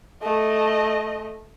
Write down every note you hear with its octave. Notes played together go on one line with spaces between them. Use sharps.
A3 D#5